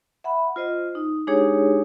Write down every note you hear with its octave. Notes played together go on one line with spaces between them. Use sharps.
E5 F#5 B5
F4 C5 D#5
D#4
G#3 D4 D#4 G4 G#4 C#5